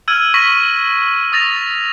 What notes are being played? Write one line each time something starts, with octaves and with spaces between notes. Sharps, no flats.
E6 F6 G#6 D#7
C#6 A#6 B6 D#7 F#7
C#6 D#6 A6 A#6 F7